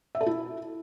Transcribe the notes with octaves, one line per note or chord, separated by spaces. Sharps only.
E5
A4
E4